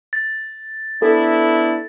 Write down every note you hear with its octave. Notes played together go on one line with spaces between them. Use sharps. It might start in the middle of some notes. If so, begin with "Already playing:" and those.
A6
B3 D4 E4 A4